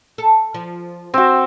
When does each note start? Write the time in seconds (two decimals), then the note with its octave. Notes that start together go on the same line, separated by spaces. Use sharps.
0.18 A4
0.54 F3
1.14 C4 F#4 G4